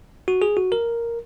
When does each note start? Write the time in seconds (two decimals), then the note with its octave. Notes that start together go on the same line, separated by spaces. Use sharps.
0.28 F#4
0.42 G#4
0.57 F#4
0.72 A#4